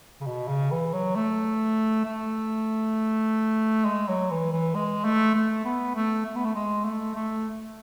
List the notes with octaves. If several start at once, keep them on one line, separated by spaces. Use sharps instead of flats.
C#3
B2
C#3
E3
F#3
A3
A3
G#3
F#3
E3
E3
G#3
A3
A3
B3
A3
A3
B3
A3
G#3
A3
A3